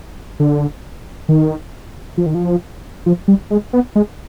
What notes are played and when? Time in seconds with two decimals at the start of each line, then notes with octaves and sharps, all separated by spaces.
0.40 D3
1.29 D#3
2.18 F3
2.26 D#3
2.35 F3
3.06 F3
3.28 G3
3.51 G#3
3.73 B3
3.95 G#3